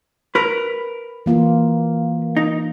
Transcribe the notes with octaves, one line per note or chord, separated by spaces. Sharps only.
A#4 B4
E3 A#3 F4
D#4